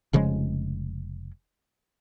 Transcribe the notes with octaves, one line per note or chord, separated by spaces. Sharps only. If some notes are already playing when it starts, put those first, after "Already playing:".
F1 C#3 F3 G#3